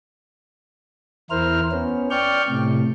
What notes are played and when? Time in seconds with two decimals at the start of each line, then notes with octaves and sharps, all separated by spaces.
1.30 E2 E4 A#4 C5 F6
1.72 B3 C#4
2.10 D5 G5 C#6 F6 G6
2.49 A2 C3